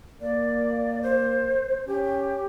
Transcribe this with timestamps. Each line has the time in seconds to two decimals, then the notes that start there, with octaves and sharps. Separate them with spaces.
0.21 A#3 D5
1.02 C5
1.86 C#4 G4